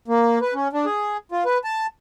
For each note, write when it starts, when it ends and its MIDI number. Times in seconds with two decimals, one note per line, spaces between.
0.08 0.39 58
0.41 0.54 71
0.54 0.68 61
0.73 0.85 62
0.86 1.17 68
1.32 1.44 65
1.45 1.58 71
1.64 1.87 81